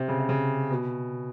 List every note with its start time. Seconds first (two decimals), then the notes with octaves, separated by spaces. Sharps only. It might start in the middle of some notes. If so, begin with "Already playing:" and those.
Already playing: C3
0.08 C#3
0.19 C3
0.29 C#3
0.70 B2